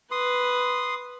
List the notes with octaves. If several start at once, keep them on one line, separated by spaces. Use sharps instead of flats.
B4 C6 D#6